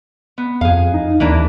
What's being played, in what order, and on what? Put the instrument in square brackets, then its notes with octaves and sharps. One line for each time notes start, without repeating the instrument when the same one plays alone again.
[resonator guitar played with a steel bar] B3
[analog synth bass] F2 [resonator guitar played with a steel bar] G#4 F5
[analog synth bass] D#4
[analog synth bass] D#2 [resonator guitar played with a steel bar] E3 A#3 D4